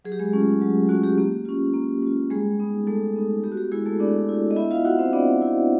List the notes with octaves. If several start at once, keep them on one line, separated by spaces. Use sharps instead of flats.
F#3 G#4
G4
G#3 G#4
A3 C#4 F4
F#3
A3 C#4 F4 F#4
G4
A#3 G4
C#4 F4
A#3
C#4 F4
G3 G#3 G#4
B3 D#4
G3 A3 A4
B3 D#4
B3 G4
F#4
G4
G#3 E4 G#4
A3 A4
B3 D4 D5
E4
D#5
B3 E4 E5
F4 F5
E4 F#4 F#5
C4 C5
B3 D4 D5
E4